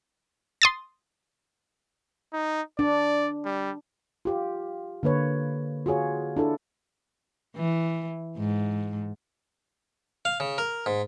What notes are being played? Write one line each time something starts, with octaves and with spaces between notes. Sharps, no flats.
C6 D#6 A6
D#4
D4 D5
G3
F4 G4
D3 A#3 B4 C#5
F4 F#4 G#4 C#5
D4 E4 A4
E3
G#2
F5
C#3
A#4
G#2